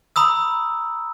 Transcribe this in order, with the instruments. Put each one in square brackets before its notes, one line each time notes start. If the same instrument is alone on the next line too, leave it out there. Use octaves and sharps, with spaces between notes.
[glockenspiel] A#5 B5 D#6 E6